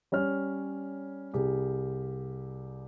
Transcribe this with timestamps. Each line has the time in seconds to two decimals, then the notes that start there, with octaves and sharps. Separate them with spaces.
0.12 G3 C#4 C#5 F6
1.33 C2 G4 G#4